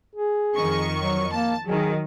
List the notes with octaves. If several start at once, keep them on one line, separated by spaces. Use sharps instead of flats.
G#4
F2 D#3 C#6
F#3
A#3 A5
D#3 F#3 G#4